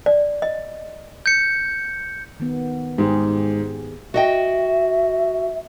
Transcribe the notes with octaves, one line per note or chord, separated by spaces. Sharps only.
D5
D#5
G6 C#7
D#3 B3
G#2 G4 G#4
F#4 D#5 E5 G5